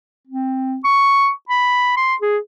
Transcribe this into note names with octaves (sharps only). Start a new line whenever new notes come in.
C4
C#6
B5
C6
G#4